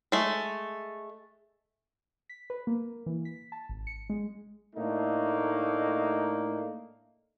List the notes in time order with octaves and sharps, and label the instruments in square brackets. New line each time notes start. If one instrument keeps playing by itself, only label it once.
[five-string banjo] G#3 A3
[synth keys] B6
B4
A#3
E3
B6
A5
G#1
C#7
G#3
[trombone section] A2 A3 A#3 D4 D#4